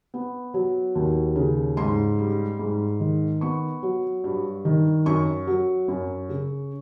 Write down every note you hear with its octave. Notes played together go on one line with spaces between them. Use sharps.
B3
F#3
D#2
C#3
G#2 C6
G3
G#2
D#3
B3 C#6
F#3
G2
D#3
F#2 C#6
F#3
F#2
C#3